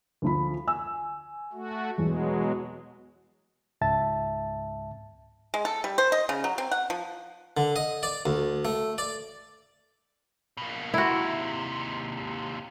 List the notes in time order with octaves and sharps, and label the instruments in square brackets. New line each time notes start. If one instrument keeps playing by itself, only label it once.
[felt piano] D2 F3 B5
G#5 E6
[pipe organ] A3 F#4
[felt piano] E2 [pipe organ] B2 F#3 G#3
[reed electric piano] C#2 G#2 E5 A5 A6
[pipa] G#3
A4
G3
C5
D#5
C#3
F#3
C4
F#5
F3
[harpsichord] D3
D#5
D5
D2
A3
D5
[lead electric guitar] B2 A#3
[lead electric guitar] D#2 C3 [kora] E4 F#4